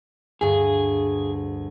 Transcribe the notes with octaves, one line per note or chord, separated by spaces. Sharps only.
D2 G2 G#4